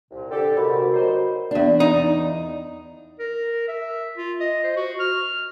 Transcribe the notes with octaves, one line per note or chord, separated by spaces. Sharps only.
C2 A#2
D3 G4 A4
D2 G#2 C3 F#4 A#4 B5
F#3 D#4 C5
E2 D4
D#4
A#4
E5
F4
D#5
C5
F#4
F6